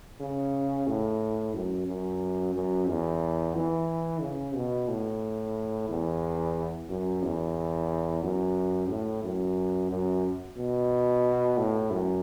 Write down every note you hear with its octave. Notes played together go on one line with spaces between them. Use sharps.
C#3
A2
F#2
F#2
F#2
E2
E3
C#3
B2
A2
E2
F#2
E2
F#2
A2
F#2
F#2
B2
A2
F#2